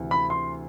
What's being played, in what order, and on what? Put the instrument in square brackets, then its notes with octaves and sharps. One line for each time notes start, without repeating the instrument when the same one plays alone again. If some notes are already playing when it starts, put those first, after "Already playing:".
Already playing: [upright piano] D2 C3 E3
B5
C6